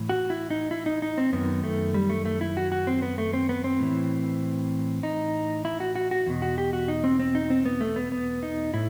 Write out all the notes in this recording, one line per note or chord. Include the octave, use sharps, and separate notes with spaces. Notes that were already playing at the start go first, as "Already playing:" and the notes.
Already playing: A2 E3
F#4
E4
D#4
E4
D#4
D#4
C4
F#2 D#3 B3
A3
G3
A3
A3
E4
F#4
F#4
C4
B3
A3
C4
B3
C4
A2 E3
D#4
E4
F#4
F#4
F#4
E2 B2
F#4
G4
F#4
D#4
C4
C4
D#4
C4
B3
A3
B3
B3
D#4
A2 E4